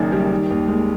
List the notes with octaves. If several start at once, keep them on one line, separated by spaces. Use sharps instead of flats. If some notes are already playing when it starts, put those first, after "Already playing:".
Already playing: F#1 F#2 D#3 D5
G3
D#3
D#2
G#3